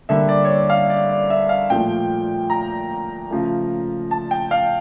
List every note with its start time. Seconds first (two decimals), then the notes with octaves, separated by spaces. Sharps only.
0.09 D3 G3 A#3 E5
0.29 D5
0.45 C#5
0.50 D5
0.70 F5
0.90 D5
1.09 D5
1.30 E5
1.49 F5
1.70 A#2 F3 A3 G5
2.50 A#5
3.30 C#3 F3 A3
4.11 A5
4.31 G5
4.51 F5